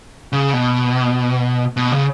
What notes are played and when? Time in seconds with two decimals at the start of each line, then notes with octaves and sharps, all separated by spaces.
0.33 C#3
0.53 B2
1.77 B2
1.92 C#3